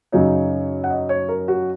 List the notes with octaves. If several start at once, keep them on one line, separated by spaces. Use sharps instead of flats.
F#2 C#3 F#3 D#4 C#5
F#5
D#5
C#5
A#4
F#4